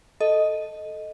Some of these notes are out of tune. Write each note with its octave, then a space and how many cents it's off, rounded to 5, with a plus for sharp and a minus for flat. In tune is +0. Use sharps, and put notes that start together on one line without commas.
A4 +0 D#5 +0